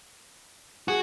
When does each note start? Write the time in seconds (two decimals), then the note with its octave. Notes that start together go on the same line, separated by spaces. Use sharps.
0.88 F#4 G#4